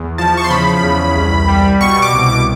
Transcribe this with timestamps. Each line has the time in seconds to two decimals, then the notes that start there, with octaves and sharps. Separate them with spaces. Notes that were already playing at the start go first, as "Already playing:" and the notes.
Already playing: E2
0.18 F3 A5
0.37 C#6
0.44 C6
0.51 C#3 B5
0.84 E2
1.16 C2
1.48 G3
1.80 B2 C#6
2.02 D6
2.13 C2
2.23 D6